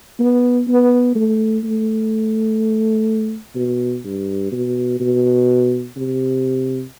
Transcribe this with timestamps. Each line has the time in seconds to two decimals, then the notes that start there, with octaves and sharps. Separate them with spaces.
0.19 B3
0.68 B3
1.15 A3
1.64 A3
3.56 B2
4.04 G2
4.52 B2
5.00 B2
5.97 C3